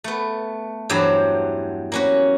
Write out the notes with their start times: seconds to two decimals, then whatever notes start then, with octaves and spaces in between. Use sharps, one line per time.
0.04 A3 B3
0.89 E2 G2 F#3 G4 C5
1.92 A#3 C#4 F#4